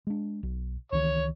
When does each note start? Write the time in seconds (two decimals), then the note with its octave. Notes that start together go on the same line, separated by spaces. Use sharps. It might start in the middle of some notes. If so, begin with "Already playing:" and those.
0.07 G#3 D4
0.43 B1
0.92 C#2 D#3 E3 C#5